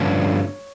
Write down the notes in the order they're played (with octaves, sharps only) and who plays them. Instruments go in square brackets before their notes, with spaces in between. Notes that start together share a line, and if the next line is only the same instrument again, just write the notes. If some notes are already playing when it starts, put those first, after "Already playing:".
Already playing: [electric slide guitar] G2 D3 F3 A3 C#4 C#5